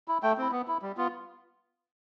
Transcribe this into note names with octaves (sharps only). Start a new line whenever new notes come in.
E4
A3 G5
C4 E4
B3
E4
G3
B3 F4